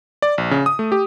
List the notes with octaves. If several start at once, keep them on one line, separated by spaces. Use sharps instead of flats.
D5
A#1
C#3
D#6
A3
G4